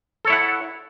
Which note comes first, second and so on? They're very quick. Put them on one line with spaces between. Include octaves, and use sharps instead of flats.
A4 C#5 E4 F#5